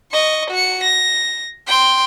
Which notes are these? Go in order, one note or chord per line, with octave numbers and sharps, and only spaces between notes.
D#5 C#6
F#4 C#7
A#6
G5 C6